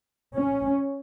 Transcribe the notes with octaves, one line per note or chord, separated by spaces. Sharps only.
C#4